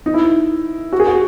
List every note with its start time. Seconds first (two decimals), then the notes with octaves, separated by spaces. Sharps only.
0.06 D#4
0.14 E4
0.22 D#4
0.93 F#4
1.00 G#4
1.07 F#4